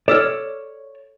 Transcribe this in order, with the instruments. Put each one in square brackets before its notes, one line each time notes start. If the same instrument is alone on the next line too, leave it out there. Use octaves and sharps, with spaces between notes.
[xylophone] A4 E6 F6 [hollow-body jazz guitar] C#5 D5